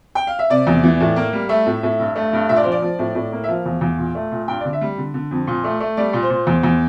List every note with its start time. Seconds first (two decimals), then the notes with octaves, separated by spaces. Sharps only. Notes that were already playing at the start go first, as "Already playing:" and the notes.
0.15 G5
0.27 F5
0.39 E5
0.50 C3 D5
0.67 E2
0.83 E3
1.00 A2
1.16 A#3
1.33 G3
1.49 A3 E5
1.66 A2
1.83 A2
2.00 G2
2.16 A3
2.33 G2
2.49 A#2 E5
2.56 D5
2.64 F3 C5
2.72 D5
2.82 F3
2.99 A2
3.15 A2
3.32 A#3
3.44 E5
3.48 F3 F5
3.66 E2
3.81 E2
3.98 A#2
4.15 A3
4.32 A#2
4.48 G2 G5
4.60 D5
4.65 D3
4.73 E5
4.81 G3
4.98 D3
5.14 D3
5.31 F2
5.47 A#2
5.64 A3
5.80 A3
5.97 G3 D5
6.13 A#2
6.22 C5
6.30 A#2
6.47 E2
6.63 E2